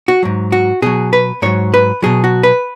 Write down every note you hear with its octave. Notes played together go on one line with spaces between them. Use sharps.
F#4
G#2 F#3
F#4
B2 F#3 G#4
B4
G#2 F#3 C#5
B4
B2 F#3 G#4
F#4
B4